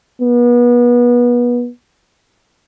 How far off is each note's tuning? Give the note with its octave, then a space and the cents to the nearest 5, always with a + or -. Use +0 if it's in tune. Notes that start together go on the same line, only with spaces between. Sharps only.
B3 -30